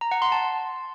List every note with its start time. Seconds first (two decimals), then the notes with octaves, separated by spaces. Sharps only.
0.01 A#5
0.11 F#5
0.22 C6
0.32 A5